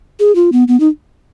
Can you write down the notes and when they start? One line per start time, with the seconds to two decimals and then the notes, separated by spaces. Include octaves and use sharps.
0.20 G#4
0.35 F4
0.52 B3
0.68 B3
0.80 D#4